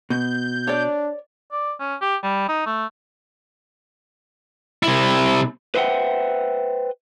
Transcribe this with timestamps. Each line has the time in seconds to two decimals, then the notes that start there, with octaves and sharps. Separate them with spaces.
0.10 B2 G6
0.67 D4 C#5 D5
1.52 D5
1.80 C#4
2.01 G4
2.23 G3
2.49 D#4
2.66 A3
4.83 C3 E4
5.75 B4 C5 E5 F#5 G5